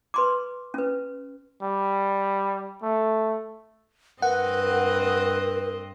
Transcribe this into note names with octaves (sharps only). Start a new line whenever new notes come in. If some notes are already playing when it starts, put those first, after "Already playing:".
B4 C6 D6
C#4 B4
G3
A3
G2 C4 A#4 B4 D#5 F#5